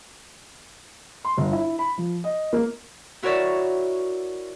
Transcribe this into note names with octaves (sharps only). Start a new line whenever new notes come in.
C6
G1
E4
B5
F3
D#5
A#3
E4 F#4 A#4 C#5 D5 E5